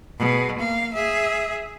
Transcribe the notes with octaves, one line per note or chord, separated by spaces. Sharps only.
B2 G#4
A#3 F5
G#4 E5